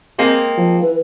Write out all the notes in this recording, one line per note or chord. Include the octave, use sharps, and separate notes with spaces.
G#3 A#3 C4
F3
E3 B4